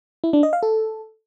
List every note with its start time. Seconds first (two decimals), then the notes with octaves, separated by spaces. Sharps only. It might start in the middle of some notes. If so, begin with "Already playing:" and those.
0.24 E4
0.33 D4
0.43 D#5
0.53 F5
0.63 A4